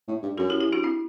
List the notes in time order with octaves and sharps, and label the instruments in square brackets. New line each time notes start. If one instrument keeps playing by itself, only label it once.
[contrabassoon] A2
G2
[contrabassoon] F#2 [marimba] F#4 A4
[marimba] E4 G4
E4 G4
D4 F#4
C4 E4